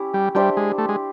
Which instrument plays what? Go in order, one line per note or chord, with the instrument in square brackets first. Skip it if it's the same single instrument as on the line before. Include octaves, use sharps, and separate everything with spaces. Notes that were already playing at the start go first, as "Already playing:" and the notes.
Already playing: [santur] C#4 E4 G4
[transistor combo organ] G3
[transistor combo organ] G3 [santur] D4 G4 C5 E5
[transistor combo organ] G#3
A3
G#3